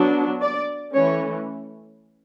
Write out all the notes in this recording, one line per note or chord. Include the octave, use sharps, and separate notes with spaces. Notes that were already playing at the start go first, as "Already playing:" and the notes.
Already playing: F#3 B3 D4
D5
E3 A3 C#4 C#5